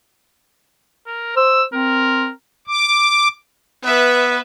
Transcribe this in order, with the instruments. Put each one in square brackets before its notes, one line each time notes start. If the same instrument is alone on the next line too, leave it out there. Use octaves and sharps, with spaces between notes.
[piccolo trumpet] A#4
[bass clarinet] C5 [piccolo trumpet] E6
[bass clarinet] C4 [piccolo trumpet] A#4
[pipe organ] D6
[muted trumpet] B3 [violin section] B4 E5